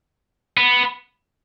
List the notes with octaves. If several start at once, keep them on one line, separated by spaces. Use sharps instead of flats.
B3